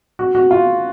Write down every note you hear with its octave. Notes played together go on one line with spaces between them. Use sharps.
F#4
F#4
F4